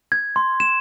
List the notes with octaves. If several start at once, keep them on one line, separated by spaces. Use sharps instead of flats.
G#6
C6
E7